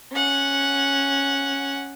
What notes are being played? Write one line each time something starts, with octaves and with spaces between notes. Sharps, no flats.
C#4 F#5